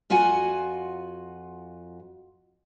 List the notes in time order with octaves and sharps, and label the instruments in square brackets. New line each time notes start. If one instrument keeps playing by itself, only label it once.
[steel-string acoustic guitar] F2 F4 F#4 F#5 G#5